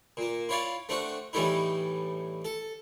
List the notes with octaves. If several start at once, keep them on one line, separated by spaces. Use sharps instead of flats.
A#2 A#3
E4 F4 C#5 D5 F5
A3 C4 D4 F#4
A2 E3 G3 A3 D#4 E4
A4